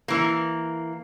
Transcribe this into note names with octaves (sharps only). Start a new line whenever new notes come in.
E3 A#3